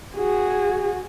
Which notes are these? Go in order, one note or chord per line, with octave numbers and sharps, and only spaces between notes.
F#4 G#4